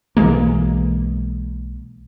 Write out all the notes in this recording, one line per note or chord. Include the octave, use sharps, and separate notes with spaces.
B1 E3 G#3 A#3